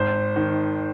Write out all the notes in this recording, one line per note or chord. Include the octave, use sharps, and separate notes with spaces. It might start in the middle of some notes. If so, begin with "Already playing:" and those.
Already playing: G#1 C5
D#3